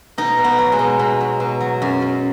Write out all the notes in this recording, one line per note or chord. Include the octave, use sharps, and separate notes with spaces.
B2 D#4
B2
B3
F#3
G#3
B2
B2
F#3
B2
F#3
F#2
F#2